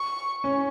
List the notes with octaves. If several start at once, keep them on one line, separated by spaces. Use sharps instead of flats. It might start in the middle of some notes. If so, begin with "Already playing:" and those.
Already playing: C#6
C#4